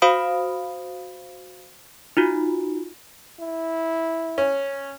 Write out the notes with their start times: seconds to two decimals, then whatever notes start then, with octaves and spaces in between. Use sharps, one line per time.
0.02 F#4 C5 F5 B5 D#6 D7
2.17 D#4 F4 F#4
3.40 E4
4.38 C#4